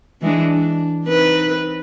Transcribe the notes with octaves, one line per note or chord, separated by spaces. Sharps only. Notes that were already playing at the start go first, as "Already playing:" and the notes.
E3 G#3 D4
D4
C4 D#4 B4